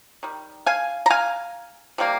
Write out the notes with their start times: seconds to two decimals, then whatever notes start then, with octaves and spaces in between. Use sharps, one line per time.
0.23 D#3 G3
0.66 F5 G#5
1.06 A#5
1.10 F5 G#5
1.98 C3 D#3 G3 A#3